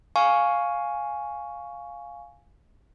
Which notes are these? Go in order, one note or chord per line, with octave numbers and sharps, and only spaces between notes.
F5 G#5 C#6